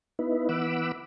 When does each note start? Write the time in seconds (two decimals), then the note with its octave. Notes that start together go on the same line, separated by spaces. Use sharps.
0.19 B3 D#4 E4 B4
0.49 E3 B3 F#5 B5 D6 E6